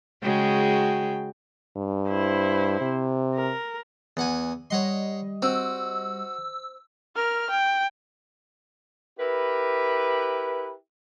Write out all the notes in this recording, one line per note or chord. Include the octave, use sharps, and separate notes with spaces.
C#3 G#3 F#4 G5
G2
E4 C5
C3
A#4
E2 F#5 G#5
G3 C#5 D#5 F#5 C6
C4 F#4 E6
A#4 F6
G5
E4 G4 A#4 B4